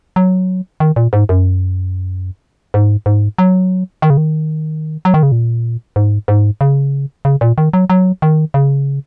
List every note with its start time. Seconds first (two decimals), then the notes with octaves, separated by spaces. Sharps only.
0.16 F#3
0.80 D#3
0.96 A#2
1.13 G#2
1.29 F#2
2.74 G#2
3.06 G#2
3.38 F#3
4.02 D#3
4.10 C#3
4.17 D#3
5.05 F#3
5.14 D#3
5.23 C#3
5.32 A#2
5.96 G#2
6.28 G#2
6.61 C#3
7.25 C#3
7.41 A#2
7.58 D#3
7.73 F#3
7.90 F#3
8.22 D#3
8.54 C#3